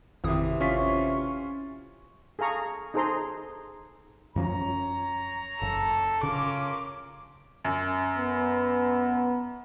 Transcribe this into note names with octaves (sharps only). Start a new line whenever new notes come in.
G#1 F2 C3 E3 D#6
C#4 F4 C#6 B6
G#4 A4 F5 A#5 C#6
D#4 G#4 A4 C5 A#5 C6
F#2 F3 C#4 C#5 A#5
F#1 A4
C#3 C#4 F4 A#4 D6
F#2
B3